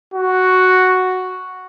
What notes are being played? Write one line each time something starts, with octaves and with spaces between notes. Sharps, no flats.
F#4